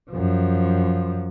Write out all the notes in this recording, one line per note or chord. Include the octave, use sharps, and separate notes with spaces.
F#2 F3